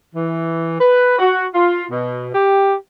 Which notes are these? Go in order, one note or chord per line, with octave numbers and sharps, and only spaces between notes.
E3
B4
F#4
F4
B2
G4